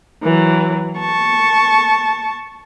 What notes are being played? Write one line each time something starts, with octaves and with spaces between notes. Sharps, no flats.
E3 F#3
A5 C#6